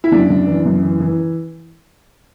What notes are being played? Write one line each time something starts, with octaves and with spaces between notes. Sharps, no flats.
E4
F#2 D4
F#2
E3
F#2
E3
E3